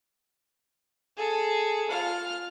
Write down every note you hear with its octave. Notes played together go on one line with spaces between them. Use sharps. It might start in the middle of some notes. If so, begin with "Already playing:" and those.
G#4 A4
F4 F6